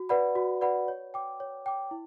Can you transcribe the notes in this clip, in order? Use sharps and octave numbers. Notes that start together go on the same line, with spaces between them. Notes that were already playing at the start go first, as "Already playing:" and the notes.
Already playing: F#4
B4 D5 F#5 B5
F#4
B4 D5 F#5 B5
C#5
G5 D6
C#5
G5 D6
E4